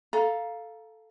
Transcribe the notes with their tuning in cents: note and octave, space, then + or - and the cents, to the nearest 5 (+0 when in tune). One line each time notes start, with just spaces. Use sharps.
A4 +0 F5 +0 A#5 +15